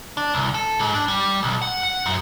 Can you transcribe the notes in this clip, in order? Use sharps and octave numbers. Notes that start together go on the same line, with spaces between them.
D4
C2
A4
G#2
D4
G3
B1
F#5
F#5
F#2